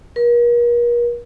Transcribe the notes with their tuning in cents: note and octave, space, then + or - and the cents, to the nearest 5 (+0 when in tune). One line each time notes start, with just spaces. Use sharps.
A#4 +40